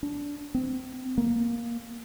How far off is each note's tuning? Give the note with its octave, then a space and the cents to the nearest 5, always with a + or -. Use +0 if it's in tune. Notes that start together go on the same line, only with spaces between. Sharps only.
D4 -20
C4 -30
A#3 +10